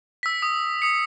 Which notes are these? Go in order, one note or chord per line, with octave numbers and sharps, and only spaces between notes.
E6 B6
D#6
D#6 C#7